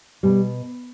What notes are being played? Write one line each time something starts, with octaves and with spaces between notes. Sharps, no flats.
B2 G3